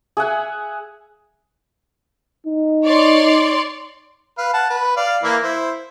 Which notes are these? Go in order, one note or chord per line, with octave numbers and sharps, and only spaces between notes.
G#4 E5 F#5 G#5
D#4
C#5 D5 C6
B4 F5
F#5 A5
B4
D5 F5
E3 A#3 E4
E4 C5